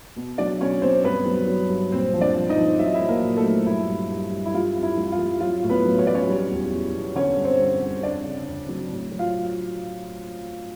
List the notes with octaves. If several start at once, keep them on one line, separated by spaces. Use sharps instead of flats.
B2
F#3 D4 D5
B2 C#4 C#5
B2 C4 C5
G2 B3 B4
F#3
F#3
G2
A#2 C4 C5
F3
D4 D5
F3
D#4 D#5
F3
F#3 E5
D#5
E4 E5
F#3
A#3 A#4
A#2
A3 A4
F#3
G2 E4
G2
G2
G3
E4
G3 F4
F2
E4
G3
F4
G3
F#3 F4
A2
B3 B4
F#3
C#5
F#3 D5
C#4 C#5
G3
E2
E2
B2
D3 C#4 C#5
G2
C4 C5
G2
D3
F2 D4 D5
C#3
F2
F#3
A2
F#3
F4 F5